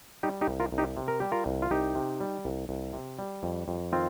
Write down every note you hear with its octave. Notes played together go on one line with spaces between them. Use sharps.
G3 D#4 G4
D#4 G4
C2
F4 A#4
C2
D#4 G4
C3
A#4
G3 G4
F4 A#4
C2
F4
C2 D#4 G4
C3
G3
C2
C2
C3
G3
F2
F2
D#3 C4 F4